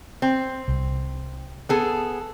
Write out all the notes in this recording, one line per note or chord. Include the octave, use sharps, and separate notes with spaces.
C4
C2
B3 G#4 A4